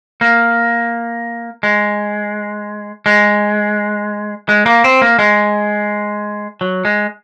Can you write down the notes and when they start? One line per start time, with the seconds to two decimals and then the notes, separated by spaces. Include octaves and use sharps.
0.21 A#3
1.63 G#3
3.06 G#3
4.49 G#3
4.66 A#3
4.84 C4
5.02 A#3
5.19 G#3
6.61 F#3
6.85 G#3